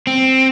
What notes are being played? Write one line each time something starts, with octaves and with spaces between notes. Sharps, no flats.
C4